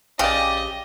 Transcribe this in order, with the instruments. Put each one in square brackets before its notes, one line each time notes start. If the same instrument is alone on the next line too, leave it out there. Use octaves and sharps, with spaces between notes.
[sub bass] A#1 [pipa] C#3 D5 [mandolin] G4 [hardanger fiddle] D#5